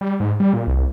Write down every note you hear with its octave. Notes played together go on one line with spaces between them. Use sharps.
G3
G#2
G3
A#2
C2